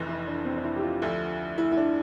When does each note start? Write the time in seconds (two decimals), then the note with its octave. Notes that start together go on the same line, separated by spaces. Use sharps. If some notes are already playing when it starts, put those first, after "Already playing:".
Already playing: F1 F2 E3
0.08 E4
0.27 D4
0.45 C4
0.57 D4
0.64 E4
0.76 G4
0.83 F4
1.02 D2 D3 F3 A3 E4
1.58 E4
1.72 E4
1.77 D4